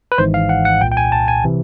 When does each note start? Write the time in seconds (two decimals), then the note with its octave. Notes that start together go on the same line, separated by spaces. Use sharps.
0.12 B4
0.18 G#1 G#2 E3 C5
0.34 F5
0.49 F#5
0.65 F#5
0.81 C2 A#2 G5
0.92 G5
0.97 G#5
1.12 A5
1.28 G#5
1.44 C3 E3